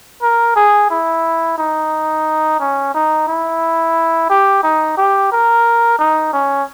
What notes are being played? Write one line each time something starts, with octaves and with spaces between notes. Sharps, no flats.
A#4
G#4
E4
D#4
C#4
D#4
E4
G4
D#4
G4
A#4
D#4
C#4